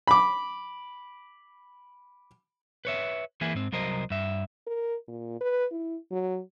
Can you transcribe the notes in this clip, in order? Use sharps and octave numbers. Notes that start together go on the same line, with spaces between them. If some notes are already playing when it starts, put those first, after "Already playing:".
B5 D6
B4 C#5 E5
E3 A#3 E4 G#4
G#2 C4
C2 F#3 A#4 C5 D#5
G2 E5
A#4
A#2
B4
E4
F#3